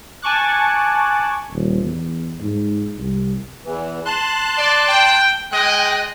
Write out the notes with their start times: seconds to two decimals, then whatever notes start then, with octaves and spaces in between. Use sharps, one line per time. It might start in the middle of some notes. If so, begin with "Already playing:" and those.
0.22 G#5 A5 C#6 D6 F#6
1.51 D#1
1.83 E2
2.41 G#2
2.98 C2
3.65 E2 E3
4.05 A5 C6 F#6
4.56 D5
4.88 G5
5.51 G#3 D#5 G5 F#6